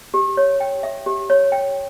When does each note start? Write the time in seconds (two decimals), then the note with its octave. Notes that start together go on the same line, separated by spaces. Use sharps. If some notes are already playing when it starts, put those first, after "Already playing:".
0.14 G4
0.37 C#5
0.60 G5
0.83 E5
1.06 G4
1.30 C#5
1.52 G5